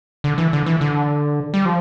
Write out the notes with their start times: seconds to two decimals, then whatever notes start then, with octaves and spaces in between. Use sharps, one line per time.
0.24 D3
0.38 E3
0.53 D3
0.66 E3
0.81 D3
1.54 G3
1.65 F3